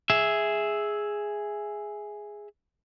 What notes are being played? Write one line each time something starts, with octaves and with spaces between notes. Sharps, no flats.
G#4 E5